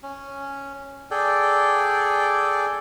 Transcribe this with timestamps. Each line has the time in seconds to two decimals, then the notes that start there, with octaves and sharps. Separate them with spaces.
0.03 C#4
1.11 G#4 A4 D5 G5